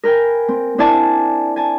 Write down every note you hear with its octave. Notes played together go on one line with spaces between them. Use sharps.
A#4 B4 G5 G#5 B5
C4
C4 D4 E4 D5 G#5 A5
G#5 A5